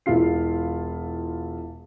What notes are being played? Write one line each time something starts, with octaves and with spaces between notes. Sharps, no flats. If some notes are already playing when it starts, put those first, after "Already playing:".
E1 E4 F4 C7